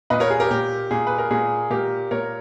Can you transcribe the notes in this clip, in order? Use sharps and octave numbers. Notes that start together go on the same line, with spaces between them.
A#2 B4 D#5
A#4 C#5
G#4
G4 A#4
A#2 G4
A#2 G#4
B4
A#4
A#2 G#4
A#2 G4 A#4
A#2 A#4 C#5